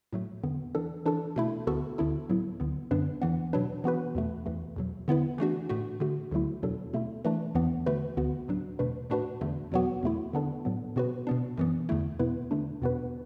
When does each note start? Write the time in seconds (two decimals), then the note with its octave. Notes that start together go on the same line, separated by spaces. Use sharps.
0.13 A2 F#3 A3
0.43 E2 D3 B3
0.75 E3 D4 A4
1.06 E3 D4 A4
1.36 B2 A3 E4
1.67 D2 D3 B3 F#4 A4
1.98 D2 D3 B3 E4 A4
2.29 A2 F#3 B3 E4
2.60 D2 D3 B3
2.91 F#2 D3 B3 D4 B4
3.22 E2 E3 B3
3.53 B2 F#3 D4 B4
3.84 E3 B3 F#4 B4
4.15 E2 B2 A3
4.46 E2 E3 A3
4.76 E2 B2 F#3
5.08 D3 B3 E4 B4
5.38 E3 A3 D4 F#4
5.69 A2 A3 F#4
6.00 D3 A3 F#4
6.31 D2 D3 F#3 A3 E4
6.62 E2 B2 F#3 D4 A4
6.93 B2 A3 E4
7.25 E3 A3 D4
7.55 E2 E3 B3
7.86 D3 A3 F#4 B4
8.17 D2 D3 B3 F#4
8.48 A2 F#3 D4
8.79 E2 B2 A3 D4 B4
9.10 A2 A3 D4 F#4 B4
9.41 E2 D3 A3
9.72 E2 B2 F#3 B3 F#4
10.03 E2 B2 A3 E4
10.33 D3 B3 D4 A4
10.65 A2 F#3 B3
10.96 B2 B3 F#4 B4
11.27 B2 B3 D4
11.57 F#2 E3 B3
11.89 E2 D3 A3 E4
12.19 E2 B2 B3 E4 B4
12.51 D3 A3 D4
12.82 E2 B2 B3 F#4 B4